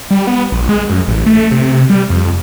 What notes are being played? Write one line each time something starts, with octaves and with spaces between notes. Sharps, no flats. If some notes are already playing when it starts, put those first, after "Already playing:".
G3
B3
A#1
G#3
F#2
A1
A3
C3
C3
G3
F2